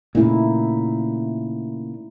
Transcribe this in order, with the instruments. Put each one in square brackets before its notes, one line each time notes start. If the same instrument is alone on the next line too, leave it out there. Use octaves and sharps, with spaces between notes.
[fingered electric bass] A#2 C#3 [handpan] A3 D#4 E4